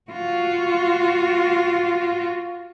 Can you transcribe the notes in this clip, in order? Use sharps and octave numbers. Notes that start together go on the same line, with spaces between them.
F4 F#4